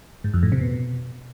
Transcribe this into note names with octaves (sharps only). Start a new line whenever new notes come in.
G#2
F2
A2
C3
B2